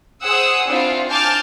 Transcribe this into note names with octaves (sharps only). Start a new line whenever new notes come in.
G#4 C5 F#5 D#6 E6
C4 D4 E4 F4 F5
G#5 A5 D6 F6 G6 A6